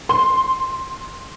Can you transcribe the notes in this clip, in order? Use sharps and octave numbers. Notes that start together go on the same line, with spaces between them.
C6